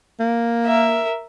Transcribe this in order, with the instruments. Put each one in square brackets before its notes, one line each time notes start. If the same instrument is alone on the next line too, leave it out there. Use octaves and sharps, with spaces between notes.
[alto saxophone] A#3
[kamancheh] A#4 E5